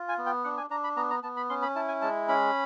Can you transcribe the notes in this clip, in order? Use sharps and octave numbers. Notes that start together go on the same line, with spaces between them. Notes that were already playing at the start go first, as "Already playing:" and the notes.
Already playing: F4
G#5
B3
G5
D4 F#5
G#5
D4 A#5
B5
B3 A#5
A#5
B3 A5
B5
C#4 C6
B5
E4 A5
G#5
G#3 A5
C#4 B5